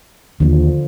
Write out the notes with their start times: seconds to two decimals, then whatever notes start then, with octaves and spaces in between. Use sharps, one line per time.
0.40 D#2 D3 F3